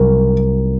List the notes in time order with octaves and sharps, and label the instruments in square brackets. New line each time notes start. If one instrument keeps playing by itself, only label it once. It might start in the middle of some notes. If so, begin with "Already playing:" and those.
Already playing: [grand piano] C2 C3 F#3 A#4